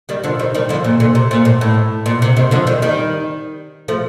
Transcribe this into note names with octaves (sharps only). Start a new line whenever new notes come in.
D#3 G3
D3 F3
D#3 G3
D#3 G3
D3 F3
A#2
A#2 D3
C3
A#2
A2
A2
A#2
C3
C3 D#3
D3 F3
D#3 G3
D#3 G3
F3 A3